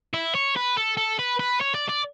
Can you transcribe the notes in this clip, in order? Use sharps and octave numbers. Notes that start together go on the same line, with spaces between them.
E4
C#5
B4
A4
A4
B4
B4
C#5
D5
D5